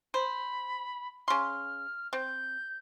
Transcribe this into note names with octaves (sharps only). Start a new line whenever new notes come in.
C5 B5
C#3 C6 F6
C4 G6